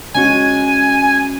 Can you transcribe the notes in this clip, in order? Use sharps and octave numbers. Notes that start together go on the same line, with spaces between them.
G#3 C#4 F#4 G#5